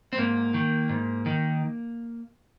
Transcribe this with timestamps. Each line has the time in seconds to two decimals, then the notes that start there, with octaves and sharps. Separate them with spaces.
0.13 C4
0.17 G#2 A#3
0.54 D#3
0.89 G#2
1.26 D#3